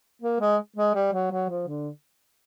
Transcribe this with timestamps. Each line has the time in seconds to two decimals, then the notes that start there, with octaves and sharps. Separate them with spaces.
0.22 A#3
0.41 G#3
0.76 G#3
0.95 G3
1.13 F#3
1.31 F#3
1.50 F3
1.68 D3